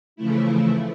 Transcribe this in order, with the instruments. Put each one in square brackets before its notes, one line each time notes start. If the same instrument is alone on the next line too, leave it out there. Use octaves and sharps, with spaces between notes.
[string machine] C#3 E3 F3 A3 E4